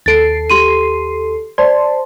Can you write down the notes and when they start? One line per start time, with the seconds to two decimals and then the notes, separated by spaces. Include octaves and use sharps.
0.06 D#2 A4 A6 C7 D7
0.50 G4 C6 D#7
1.58 C5 D5 A5 C6